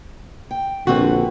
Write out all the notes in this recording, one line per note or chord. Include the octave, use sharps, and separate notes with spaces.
G5
A#1 D3 C4 F#4 B4